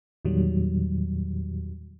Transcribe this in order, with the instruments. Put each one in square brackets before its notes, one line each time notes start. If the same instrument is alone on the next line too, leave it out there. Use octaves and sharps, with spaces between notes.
[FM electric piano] E2 A#2 D#3 F#3 G3